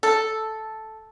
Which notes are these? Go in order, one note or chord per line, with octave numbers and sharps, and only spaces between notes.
A4